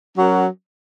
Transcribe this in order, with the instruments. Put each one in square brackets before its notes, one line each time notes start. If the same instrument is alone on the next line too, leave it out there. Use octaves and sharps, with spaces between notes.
[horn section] F#3 C#4 F#4 A#4